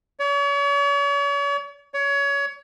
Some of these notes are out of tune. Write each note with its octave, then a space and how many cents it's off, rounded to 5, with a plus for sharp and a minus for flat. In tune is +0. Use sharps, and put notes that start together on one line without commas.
C#5 +40
C#5 +25